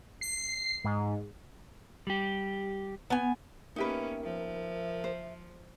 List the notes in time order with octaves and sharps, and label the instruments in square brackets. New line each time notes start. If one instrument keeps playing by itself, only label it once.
[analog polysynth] C7
G#2
[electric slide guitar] G3 G4
[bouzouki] B3 G#5
[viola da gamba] A#3 B3 C#4 [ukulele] D#4 G4 B4 [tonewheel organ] A#4 [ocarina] E5
[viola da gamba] F3 [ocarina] E5
[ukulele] C5